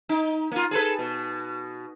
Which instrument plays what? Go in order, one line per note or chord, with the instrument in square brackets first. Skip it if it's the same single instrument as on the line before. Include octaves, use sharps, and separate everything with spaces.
[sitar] D#4
A#3 F4
G#4 A4 B4
B2